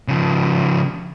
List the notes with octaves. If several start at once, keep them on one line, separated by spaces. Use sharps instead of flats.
C#3 F3